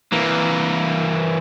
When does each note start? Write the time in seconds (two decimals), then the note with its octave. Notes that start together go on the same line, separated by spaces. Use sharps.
0.12 E3 A#3